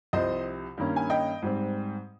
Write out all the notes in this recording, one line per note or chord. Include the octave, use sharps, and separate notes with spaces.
C2 C3 F3 C5 D#5
G2 D#3 A#3 C#4
G#5
D#5 G5
G#2 G3 C4